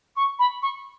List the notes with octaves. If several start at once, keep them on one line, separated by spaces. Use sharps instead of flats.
C#6
B5
C#6